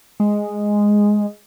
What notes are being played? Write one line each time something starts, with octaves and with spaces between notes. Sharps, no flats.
G#3